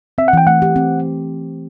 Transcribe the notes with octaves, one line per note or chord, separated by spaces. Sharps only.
C4 E5
F#5
E3 G5
A3 F#5
G4
C4